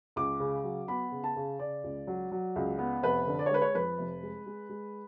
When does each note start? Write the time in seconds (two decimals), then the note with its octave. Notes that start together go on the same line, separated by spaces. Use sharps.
0.16 C#2 D6
0.40 C#3
0.64 F#3
0.88 B3 B5
1.12 C#3
1.24 A5
1.36 C#3
1.59 C#3 D5
1.83 C#2
2.07 F#3
2.31 F#3
2.56 C#2
2.79 B3
3.03 F1 B4
3.27 D3
3.39 D5
3.46 C#5
3.50 G#3 B4
3.62 C#5
3.74 F2 B4
3.98 F1
4.23 G#3
4.46 G#3
4.70 G#3